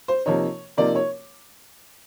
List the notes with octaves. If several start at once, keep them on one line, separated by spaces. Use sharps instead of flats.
C5
C3 F3 A#3 D#4 C#5
C3 F3 A#3 D#4 D5
C#5